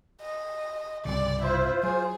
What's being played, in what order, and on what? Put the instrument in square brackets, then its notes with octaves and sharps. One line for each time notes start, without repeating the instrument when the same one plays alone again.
[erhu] D#5
[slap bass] C2 G2 C#3 [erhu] D5
[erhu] E4 [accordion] F4 C5
[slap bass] F#3 [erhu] G#4